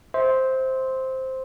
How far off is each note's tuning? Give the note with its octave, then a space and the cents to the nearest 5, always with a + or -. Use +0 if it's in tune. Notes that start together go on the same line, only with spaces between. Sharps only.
C5 +0 E5 -35 C6 +0